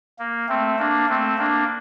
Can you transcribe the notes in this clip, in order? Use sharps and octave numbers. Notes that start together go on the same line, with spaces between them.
A#3
A3 C4
A#3 D4
A3 C4
A#3 D4